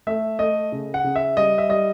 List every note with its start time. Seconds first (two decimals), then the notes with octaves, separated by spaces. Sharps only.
0.07 A3 E5
0.39 A3 D#5
0.72 C#3
0.94 F#5
1.04 C#3
1.16 E5
1.37 G3 D#5
1.58 E5
1.69 G3 D#5